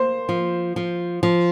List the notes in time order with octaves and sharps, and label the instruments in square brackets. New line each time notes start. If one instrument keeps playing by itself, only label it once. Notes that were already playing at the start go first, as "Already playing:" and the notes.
Already playing: [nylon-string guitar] A#3 [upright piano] C5
[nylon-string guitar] F3
F3
F3